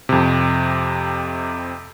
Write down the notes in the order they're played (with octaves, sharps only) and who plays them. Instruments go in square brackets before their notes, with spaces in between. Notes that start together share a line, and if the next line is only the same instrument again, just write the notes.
[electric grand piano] F2 C3